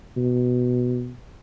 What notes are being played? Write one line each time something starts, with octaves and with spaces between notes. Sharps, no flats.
B2